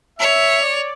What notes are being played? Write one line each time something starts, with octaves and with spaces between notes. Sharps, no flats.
C#5 E5
D5